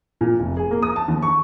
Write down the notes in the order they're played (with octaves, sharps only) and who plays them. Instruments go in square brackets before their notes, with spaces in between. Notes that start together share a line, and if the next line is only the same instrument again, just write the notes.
[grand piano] A#2
F1
G#4
A#3
D#6
A5
D#2
C#6